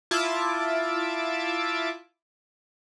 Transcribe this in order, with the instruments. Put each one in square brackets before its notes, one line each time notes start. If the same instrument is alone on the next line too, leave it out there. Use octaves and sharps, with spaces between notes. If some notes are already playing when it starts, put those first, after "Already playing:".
[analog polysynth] E4 F4 E5 A5 D6